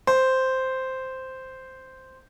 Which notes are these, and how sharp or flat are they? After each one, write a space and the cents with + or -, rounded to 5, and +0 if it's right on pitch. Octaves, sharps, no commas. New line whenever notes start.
C5 -5